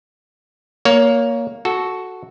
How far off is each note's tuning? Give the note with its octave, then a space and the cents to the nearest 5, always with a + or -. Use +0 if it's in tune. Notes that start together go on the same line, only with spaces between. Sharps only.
A#3 +5 C#5 +20
F#4 +0 A4 -10